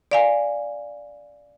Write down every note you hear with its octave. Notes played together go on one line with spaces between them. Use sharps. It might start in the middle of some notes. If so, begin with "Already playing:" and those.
D5 F5 G#5